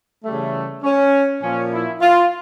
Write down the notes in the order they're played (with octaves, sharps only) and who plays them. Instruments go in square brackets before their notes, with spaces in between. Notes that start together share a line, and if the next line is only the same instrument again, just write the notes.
[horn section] C#3 E3 G3 A3
C#4
A#2 F3 C#4
E4
F4